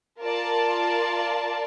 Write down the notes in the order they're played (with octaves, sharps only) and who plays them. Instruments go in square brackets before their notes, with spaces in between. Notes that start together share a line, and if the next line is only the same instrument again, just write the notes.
[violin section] F4 A#4 D5 A5